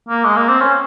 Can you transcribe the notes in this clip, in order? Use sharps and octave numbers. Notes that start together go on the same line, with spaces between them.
A#3
G#3
A#3
C4
C#4